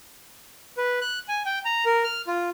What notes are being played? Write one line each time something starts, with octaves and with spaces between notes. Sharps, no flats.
B4
F#6
G#5
G5
A#5
A#4
F6
F4